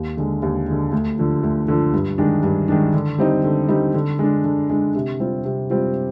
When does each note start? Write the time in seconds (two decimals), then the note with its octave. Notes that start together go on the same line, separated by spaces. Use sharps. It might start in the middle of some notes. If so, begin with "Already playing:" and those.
Already playing: D#2
0.17 D3 G#3
0.42 D#2
0.68 D3 G#3
0.92 D2
1.18 D3 F3
1.43 D2
1.68 D3 F3
1.94 G2
2.18 D#3 G#3 D4
2.43 G2
2.68 D#3 G#3 D4
2.94 D3
3.18 G3 C4 D#4
3.44 D3
3.69 G3 C4 D#4
3.94 D3
4.19 G#3 D4
4.44 D3
4.70 G#3 D4
4.95 C3
5.20 G3 C4 F4
5.45 C3
5.70 G3 C4 F4